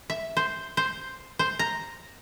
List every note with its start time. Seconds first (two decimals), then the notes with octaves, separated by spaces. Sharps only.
0.10 E5
0.37 C5
0.77 C5
1.39 C5
1.59 A#5